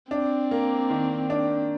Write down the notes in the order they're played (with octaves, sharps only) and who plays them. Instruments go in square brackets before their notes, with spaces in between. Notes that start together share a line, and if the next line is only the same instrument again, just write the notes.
[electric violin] C4 [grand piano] D4
[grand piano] A#3
D#3
D4